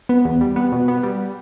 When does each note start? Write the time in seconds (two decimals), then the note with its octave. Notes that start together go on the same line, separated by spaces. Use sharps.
0.09 B3
0.25 E2
0.41 G3
0.56 B3
0.72 B2
0.88 B3
1.03 G3